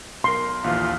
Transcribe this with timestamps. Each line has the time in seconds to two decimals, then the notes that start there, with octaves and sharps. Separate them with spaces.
0.24 B1 A#4 C6
0.64 A#1 D#2 E3 F4